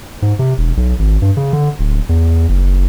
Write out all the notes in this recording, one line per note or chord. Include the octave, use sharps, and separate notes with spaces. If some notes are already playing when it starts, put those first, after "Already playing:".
G#2
C3
E1
B1
G#1
G2
C#3
D3
D1
E2
F#1